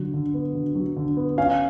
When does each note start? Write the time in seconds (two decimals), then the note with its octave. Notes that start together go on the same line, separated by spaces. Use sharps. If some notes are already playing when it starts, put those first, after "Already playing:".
Already playing: D3 F#3
0.14 D3
0.34 B3
0.55 D3
0.75 F#3
0.96 D3
1.17 B3
1.38 C#4 F5